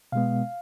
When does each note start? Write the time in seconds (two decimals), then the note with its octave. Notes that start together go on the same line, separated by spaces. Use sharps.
0.12 B2 G#3 B3 F5